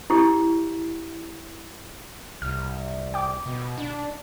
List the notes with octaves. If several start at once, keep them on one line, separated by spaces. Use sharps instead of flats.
E4 G4
C2 F6
G5 D6
B2
D4